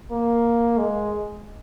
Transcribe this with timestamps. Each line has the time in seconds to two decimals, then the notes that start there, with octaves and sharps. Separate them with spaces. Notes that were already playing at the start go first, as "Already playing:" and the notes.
0.11 A#3
0.78 G#3